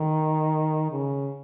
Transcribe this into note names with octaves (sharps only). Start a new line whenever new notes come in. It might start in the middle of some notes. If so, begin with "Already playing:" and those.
Already playing: D#3
C#3